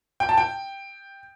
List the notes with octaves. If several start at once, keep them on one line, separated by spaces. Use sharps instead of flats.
G5
A5
G5